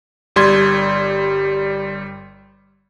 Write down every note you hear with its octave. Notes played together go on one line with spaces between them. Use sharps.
G1 G3 C6 G#6